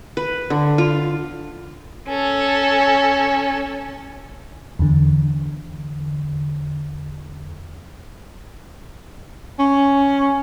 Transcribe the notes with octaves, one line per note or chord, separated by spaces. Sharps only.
B4
D3
F4
C#4 A4
E2 D3
C#4